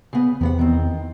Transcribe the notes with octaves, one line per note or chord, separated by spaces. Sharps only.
C#3 B3
E2 C3 B3 F#5
D#3 C4